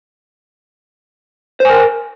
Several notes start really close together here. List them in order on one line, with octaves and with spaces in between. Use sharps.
C5 G#5 A#4